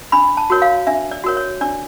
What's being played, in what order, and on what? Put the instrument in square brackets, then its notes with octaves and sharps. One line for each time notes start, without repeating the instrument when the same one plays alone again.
[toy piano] D4 B5
A5
F#4 A#4 C#5
F5
D4 E5
D5
F#4 A#4 C#5
C#5
D4 D5